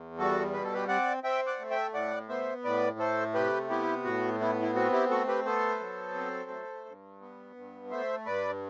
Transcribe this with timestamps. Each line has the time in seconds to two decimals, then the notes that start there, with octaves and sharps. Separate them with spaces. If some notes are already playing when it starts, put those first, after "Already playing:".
Already playing: E2
0.18 G3 F#4 A4
0.53 B2 B4
0.64 A4
0.74 G4 B4
0.88 C4 D5 F#5
1.24 C4 E5 G5
1.47 D5 F#5
1.59 A3
1.70 E5 G5
1.94 A2 D5 F#5
2.29 B3 C5 E5
2.64 A2 B4 D5
2.99 A3 A4 C5
3.34 C3 G4 B4
3.69 B3 E4 G4
4.04 A2 F#4
4.40 B3 E4
4.62 E4
4.75 C4 F#4
4.92 E4 G4
5.10 A3 F#4 A4
5.28 G4 B4
5.45 B3 A4 C5
5.80 F#3
6.15 C4
6.50 A3
6.86 G2
7.21 B3
7.56 G2
7.91 A3 C5 E5
8.26 G2 B4 D5